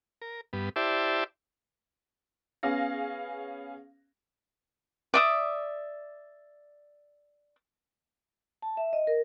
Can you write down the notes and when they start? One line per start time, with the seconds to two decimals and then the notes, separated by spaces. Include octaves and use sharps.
0.22 A#4
0.53 G2 B3
0.76 E4 G4 C5 D5 E5 A5
2.63 B3 C#4 G#4 F5 A#6
5.14 D5 E5 D#6
8.62 A5
8.77 E5
8.93 D#5
9.07 A#4